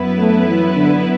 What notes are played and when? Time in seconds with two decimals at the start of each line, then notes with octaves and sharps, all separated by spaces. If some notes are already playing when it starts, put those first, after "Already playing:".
Already playing: F#2 F#3 B3 E4 B4
0.19 A3
0.47 E3
0.75 D3